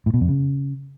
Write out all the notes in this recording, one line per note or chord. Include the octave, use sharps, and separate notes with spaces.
A2
B2
F2
C#3